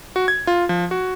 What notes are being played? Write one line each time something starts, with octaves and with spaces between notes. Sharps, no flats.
F#4
G#6
F4
F3
F#4